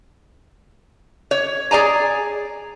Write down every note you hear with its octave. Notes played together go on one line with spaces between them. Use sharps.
C#5
G#4 D5 G#5 A#5